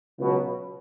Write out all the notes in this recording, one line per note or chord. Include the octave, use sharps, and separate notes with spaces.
C#2 B2 F#3 B3